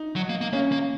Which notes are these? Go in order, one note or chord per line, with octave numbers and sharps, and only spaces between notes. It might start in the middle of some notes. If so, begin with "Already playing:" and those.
Already playing: D#4
F#3
A#3
A#3
A#3 C#4
A#3